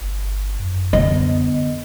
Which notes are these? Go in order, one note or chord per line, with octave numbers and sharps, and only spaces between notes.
G1
F#2
D3 B3 D#5